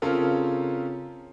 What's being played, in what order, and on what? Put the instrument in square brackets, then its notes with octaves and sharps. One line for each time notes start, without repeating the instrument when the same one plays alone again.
[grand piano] C#3 C4 C#4 F4 A4 A#4